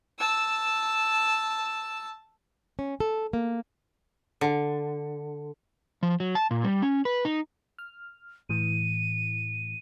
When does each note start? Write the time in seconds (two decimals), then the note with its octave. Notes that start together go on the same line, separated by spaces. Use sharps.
0.19 A5 E6
2.79 C#4
3.00 A4
3.33 A#3
4.41 D3
6.03 F3
6.20 F#3
6.35 A5
6.51 A#2
6.64 G3
6.82 C#4
7.05 B4
7.25 D#4
7.78 F6
8.49 A2 E3 D#7